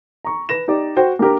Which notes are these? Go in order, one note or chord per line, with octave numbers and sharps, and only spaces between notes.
A#5 C#6
B4 A#6 E7
D#4 G4 D5
F#4 C5 G5
A#3 D4 G4 A#4